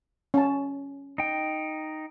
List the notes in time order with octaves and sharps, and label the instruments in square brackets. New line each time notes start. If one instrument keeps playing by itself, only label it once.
[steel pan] C#4 A5
[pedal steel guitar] D#4 G5